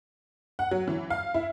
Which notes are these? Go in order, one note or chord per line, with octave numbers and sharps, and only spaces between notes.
F#5
F#3
E3
F5
E4